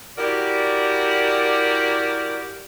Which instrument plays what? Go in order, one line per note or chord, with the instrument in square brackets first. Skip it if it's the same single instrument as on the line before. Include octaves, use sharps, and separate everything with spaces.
[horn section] E4 F#4 G4 A#4 D5